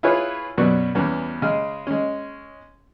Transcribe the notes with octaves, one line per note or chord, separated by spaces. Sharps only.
E4 F4 G#4 B4 C#5
F#2 B2 F#3 B3 D5 C#6
E2 G3 B3 C#4
C#3 G#3 F6
G#3 C#4